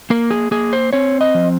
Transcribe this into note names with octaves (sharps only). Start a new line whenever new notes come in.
A#3 A#4
G#4
A#3 G#4
C5
C4 C#5
D#5
F3